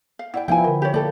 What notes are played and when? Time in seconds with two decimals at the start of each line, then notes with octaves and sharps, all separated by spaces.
0.19 F5
0.34 E4 D5 F#5 G5
0.48 F3 B3 E4 E5 F5 G5 G#5
0.64 D3 A#4
0.82 G4 C#5
0.94 A#3 G4 A4 D5